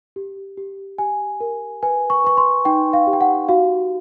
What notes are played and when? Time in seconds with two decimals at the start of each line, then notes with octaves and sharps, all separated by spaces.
0.16 G4
0.57 G4
0.98 G4 G#5
1.40 A#4
1.83 B4 G#5
2.10 C#6
2.24 B4 C#6
2.37 C6
2.65 D#4 G5
2.93 F5
3.07 G4
3.13 G5
3.21 F#5
3.48 F#4 F5